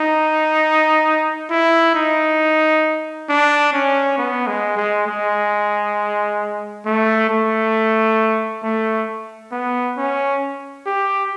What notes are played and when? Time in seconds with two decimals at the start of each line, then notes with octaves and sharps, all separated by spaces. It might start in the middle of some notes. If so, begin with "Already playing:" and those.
Already playing: D#4
1.50 E4
1.95 D#4
3.29 D4
3.73 C#4
4.18 B3
4.47 G#3
4.77 G#3
5.07 G#3
6.85 A3
7.29 A3
8.63 A3
9.52 B3
9.97 C#4
10.86 G4